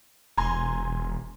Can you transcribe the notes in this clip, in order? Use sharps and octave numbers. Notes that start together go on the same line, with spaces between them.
E1 G#5 A#5 C6